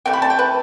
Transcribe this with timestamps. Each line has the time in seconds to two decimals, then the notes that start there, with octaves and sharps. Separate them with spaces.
0.06 C3 E3 A3 G5
0.13 B5
0.22 A5
0.30 G5
0.39 B4